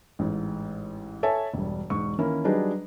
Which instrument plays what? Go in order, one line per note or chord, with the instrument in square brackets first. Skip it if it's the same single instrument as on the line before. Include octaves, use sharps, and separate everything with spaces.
[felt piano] A1 G#2
A4 C#5 E5 G#5 A5
E1 G2
E1 G#2 C#6
D#3 E3 A#3 C#4 E4
F#3 G3 D4 D#4 G#4 B4